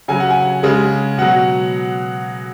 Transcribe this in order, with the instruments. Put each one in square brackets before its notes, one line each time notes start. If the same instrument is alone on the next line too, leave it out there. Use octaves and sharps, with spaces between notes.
[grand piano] C#3 F#3 G#5
F#5
G#5
C#3 G#3
B2 F#3 F#5